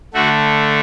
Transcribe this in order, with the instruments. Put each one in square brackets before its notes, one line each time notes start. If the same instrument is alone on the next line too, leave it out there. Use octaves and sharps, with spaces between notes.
[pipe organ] D3 A3 F#4